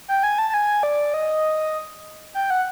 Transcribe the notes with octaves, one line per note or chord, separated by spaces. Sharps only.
G5
G#5
A5
A5
G#5
D5
D#5
G5
F#5